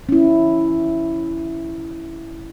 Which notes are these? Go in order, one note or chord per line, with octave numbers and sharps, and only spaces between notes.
C#4 E4